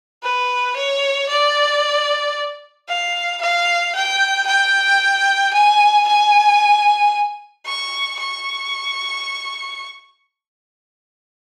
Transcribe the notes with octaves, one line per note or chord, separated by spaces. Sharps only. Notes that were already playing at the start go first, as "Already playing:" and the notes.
B4
C#5
D5
F5
F5
G5
G5
G#5
G#5
C#6
C#6